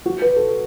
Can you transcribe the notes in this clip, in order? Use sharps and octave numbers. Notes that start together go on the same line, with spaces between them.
F#4
B4
A4